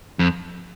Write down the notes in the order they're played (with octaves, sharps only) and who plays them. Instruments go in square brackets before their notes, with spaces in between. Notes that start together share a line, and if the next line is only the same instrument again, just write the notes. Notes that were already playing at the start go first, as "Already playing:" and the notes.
[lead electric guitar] F2